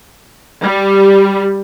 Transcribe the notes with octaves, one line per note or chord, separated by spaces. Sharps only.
G3